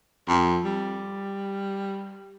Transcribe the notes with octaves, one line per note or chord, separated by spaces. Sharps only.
F2
G3